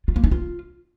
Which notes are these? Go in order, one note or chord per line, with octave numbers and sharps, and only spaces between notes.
F4
A#3
D#4
F4